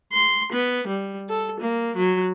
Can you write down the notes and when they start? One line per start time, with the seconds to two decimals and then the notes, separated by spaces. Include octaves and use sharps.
0.13 C6
0.53 B3
0.88 G3
1.29 A4
1.60 A#3
1.96 F#3